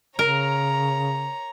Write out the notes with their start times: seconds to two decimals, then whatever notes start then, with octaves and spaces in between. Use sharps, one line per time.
0.19 C#3 A#4 C#5 A#5